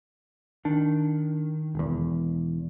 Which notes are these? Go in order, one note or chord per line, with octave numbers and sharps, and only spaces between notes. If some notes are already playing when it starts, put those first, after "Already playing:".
D#3 D4
E1 E2